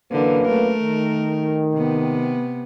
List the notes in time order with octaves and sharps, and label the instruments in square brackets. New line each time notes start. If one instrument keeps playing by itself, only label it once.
[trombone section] F#2 A#3 B4 [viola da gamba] D3 E3
[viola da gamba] A3 A#4
[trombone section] D#3
[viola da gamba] C3 B3